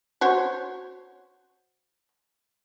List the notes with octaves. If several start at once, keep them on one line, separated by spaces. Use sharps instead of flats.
F#4 C5 C#5